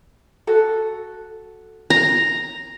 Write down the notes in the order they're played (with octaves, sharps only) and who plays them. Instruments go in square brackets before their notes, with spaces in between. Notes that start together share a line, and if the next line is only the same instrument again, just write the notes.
[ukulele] F#4 A4
[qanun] A#5